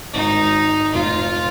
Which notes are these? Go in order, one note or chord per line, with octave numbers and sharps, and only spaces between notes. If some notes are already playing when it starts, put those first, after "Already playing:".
G#1 G#2 D#3 D#4
F1 F2 F3 F4